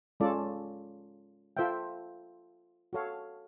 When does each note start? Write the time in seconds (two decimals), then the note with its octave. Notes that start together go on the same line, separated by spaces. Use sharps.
0.20 G#3 C#4 F4 A4 D5
1.57 F4 A4 C5 E5 G5
2.93 F#4 A4 C#5 F5